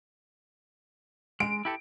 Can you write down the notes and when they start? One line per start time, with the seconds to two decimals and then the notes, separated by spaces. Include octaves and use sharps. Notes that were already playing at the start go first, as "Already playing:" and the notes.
1.40 G#3 D7
1.65 E4 G4 A4